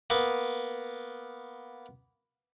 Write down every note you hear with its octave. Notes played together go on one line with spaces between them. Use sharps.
A#3 B3